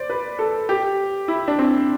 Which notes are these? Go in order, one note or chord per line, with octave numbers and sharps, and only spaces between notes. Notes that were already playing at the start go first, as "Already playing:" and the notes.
Already playing: C5 D5
B4
A4
G4
E4
D4
C4